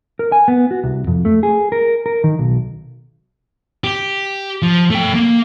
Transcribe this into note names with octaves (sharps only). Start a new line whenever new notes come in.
A#4
G#5
B3
F#4
C2
F2
A3
G#4
A#4
A#4
D#3
B1
G4
F3
A3 G5
A#3